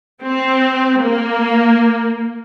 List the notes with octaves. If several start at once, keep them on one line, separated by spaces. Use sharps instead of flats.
C4
A#3